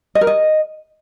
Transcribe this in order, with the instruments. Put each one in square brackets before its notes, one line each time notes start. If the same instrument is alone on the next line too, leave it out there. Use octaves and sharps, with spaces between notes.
[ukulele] D#5
A#4
D#5